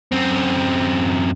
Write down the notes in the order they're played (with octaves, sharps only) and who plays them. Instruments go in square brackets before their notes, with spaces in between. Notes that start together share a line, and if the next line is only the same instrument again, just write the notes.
[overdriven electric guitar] F#2 C4